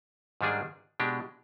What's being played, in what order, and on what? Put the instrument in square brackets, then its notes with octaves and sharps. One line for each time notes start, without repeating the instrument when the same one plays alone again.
[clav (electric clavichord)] G#2 D#3 G3 D4 G#4
B2 G#3 D4 G4